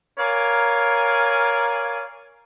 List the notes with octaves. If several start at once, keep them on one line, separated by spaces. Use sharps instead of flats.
A#4 C#5 D5 F5 G#5